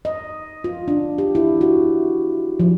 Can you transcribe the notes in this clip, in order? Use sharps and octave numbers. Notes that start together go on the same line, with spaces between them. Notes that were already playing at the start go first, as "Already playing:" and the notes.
D#5
F4
D4
G4
E4
F#4
F3